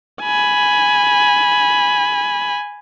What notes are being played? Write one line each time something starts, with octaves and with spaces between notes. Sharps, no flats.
G#5 B5